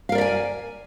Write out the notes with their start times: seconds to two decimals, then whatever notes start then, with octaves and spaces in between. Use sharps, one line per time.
0.09 F5
0.12 A#4
0.15 D5
0.18 E5
0.21 G#5